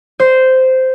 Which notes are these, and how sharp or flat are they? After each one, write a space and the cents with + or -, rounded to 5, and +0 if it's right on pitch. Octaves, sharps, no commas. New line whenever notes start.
C5 -10